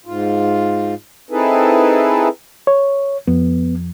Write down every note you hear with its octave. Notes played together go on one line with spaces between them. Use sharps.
G#2 F4
C4 D#4 E4 G#4 A4 B4
C#5
F2 B3